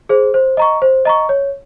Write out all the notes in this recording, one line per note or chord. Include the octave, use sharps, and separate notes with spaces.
G#4 C5
C5
D#5 A#5 C#6
C5
D#5 A#5 C#6
C#5